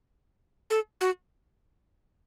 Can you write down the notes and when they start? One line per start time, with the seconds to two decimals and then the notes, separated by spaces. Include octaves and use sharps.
0.70 A4
1.01 F#4